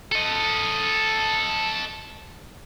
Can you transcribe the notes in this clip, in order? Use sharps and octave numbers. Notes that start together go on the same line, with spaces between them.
A4 D#5